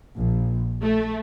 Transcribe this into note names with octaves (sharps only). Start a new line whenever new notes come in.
A#1
A3